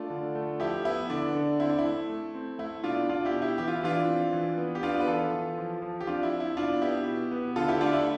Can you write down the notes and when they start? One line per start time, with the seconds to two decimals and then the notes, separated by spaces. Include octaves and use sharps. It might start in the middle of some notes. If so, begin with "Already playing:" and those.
Already playing: A3 D4 F4
0.10 D3
0.35 A3
0.60 F3 E4 G4
0.85 B3 E4
1.10 D3 D4
1.35 D3
1.59 C4 E4
1.69 D4
1.79 E4
1.84 A3
2.09 A3
2.34 C4
2.58 A3 E4
2.84 B2 D4 F4
3.09 B2 D4 F4
3.25 E4 G4
3.34 B2
3.42 E4 G4
3.58 E3 G4
3.68 F4
3.76 E4
3.83 E3 D4 F4
4.09 C4
4.33 E3
4.58 B3
4.75 G4
4.83 B3 D4 F4
5.00 B4
5.07 E3 F4 A4
5.32 E3
5.58 F3
5.82 F3
6.01 G4
6.07 C4 D4 F4
6.23 E4
6.32 C4
6.40 E4
6.57 B2 D4 F4
6.81 B3 E4 G4
7.06 B2
7.31 B3
7.56 D3 F4 A4
7.68 E4 G4
7.81 A3 D4 F4
7.93 E4